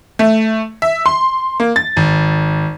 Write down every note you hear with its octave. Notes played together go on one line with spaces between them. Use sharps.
A3
E5
C6
A#3
A6
G#1